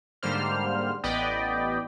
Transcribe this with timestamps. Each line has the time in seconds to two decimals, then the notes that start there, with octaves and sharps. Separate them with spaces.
0.23 G#2 D3 G3 A#3 C5 F6
1.03 A1 B3 D5 D#5 G5 B5